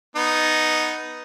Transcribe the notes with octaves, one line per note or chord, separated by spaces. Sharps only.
B3 D#4